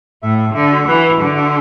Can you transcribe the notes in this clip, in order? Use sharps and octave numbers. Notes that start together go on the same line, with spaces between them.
A2 E5
E5
D3 E5
F#4
E3 B4
E5
D3 F#4
E5